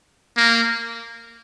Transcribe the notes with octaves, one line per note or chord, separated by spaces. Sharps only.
A#3